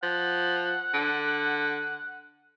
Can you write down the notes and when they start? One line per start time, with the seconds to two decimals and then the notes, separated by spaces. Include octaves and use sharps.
0.03 F3 F#5
0.94 D3